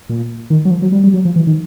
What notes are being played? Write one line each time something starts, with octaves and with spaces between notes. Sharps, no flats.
A#2
D#3
F#3
F3
F#3
G3
G3
F#3
F3
E3
D#3